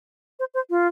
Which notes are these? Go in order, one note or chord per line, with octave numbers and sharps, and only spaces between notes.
C5
C5
F4